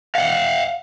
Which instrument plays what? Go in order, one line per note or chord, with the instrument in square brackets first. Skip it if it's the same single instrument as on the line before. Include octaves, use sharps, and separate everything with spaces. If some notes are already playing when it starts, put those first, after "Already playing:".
[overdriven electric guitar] F5 F#5